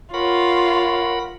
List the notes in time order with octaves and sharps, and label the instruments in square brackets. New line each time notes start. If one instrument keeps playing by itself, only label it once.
[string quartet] F4 [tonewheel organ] A#4 F#5 B5 [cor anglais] C#5